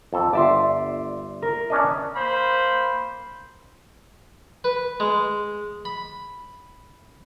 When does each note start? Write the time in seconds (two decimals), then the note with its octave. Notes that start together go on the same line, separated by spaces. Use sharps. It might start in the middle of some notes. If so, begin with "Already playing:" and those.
0.13 F2 A4
0.33 G1 D5 E5 C6
1.42 A#4
1.70 C#4 D4 D#5
2.14 A#3 C5 B5
4.64 B4
5.00 G#3
5.85 B5